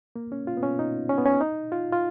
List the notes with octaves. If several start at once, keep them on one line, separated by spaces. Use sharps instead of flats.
A#3
C#4
F4
B3
C#4
D#4
C#4
B3
C#4
D#4
F4
F4